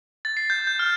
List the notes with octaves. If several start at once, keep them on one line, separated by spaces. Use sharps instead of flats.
A6
C7
G6
G6
F6